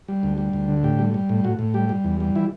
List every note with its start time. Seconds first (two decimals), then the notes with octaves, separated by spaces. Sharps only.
0.08 G3
0.23 D2
0.38 G3
0.53 D2
0.68 D3
0.83 A2 G4
0.99 G3
1.14 G3
1.29 A2
1.44 A2 F#4
1.59 A2
1.74 G3 G4
1.89 G3
2.04 E2
2.20 G3
2.36 E3 E4